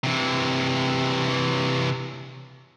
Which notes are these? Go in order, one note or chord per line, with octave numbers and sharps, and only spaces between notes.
C3 E3